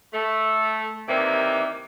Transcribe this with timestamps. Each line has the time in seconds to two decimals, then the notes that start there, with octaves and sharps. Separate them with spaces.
0.13 A3
1.09 C3 D#3 E3 G3 A#3